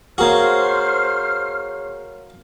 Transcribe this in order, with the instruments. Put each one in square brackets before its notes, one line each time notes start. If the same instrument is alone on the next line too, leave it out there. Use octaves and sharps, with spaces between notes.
[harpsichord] A#3 F#4 [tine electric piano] G#4 A#4 C#5 [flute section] C5 F6